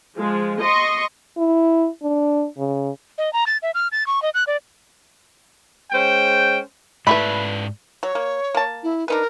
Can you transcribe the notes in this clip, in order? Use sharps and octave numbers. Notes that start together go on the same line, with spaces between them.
F3 G#3
D#5 C6 C#6
E4
D4
C#3
D#5
A#5
A6
E5
F6
A6
C#6
D#5
F#6
D5
G#3 C#4 C5 G5
G#2 A3 E4 B4 D5 B5
F#3 C#5
A#3
A#3 A5
E4
D4 D#4 A#4 B4